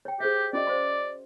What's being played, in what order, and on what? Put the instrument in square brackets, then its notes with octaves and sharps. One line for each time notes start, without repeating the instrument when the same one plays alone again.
[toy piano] C#5 G5
[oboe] G4 [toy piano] G#4 C5 E5
[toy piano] C#4 F#4 D#5 [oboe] D5
[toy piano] C5 F5 C6